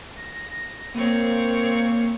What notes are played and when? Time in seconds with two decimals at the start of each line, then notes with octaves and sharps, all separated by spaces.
0.16 A#6
0.95 A#3 C4 C#5
1.45 A#3